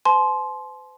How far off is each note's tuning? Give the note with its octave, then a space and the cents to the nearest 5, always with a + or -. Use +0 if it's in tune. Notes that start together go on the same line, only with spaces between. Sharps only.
C5 -45 A5 -45 C6 +0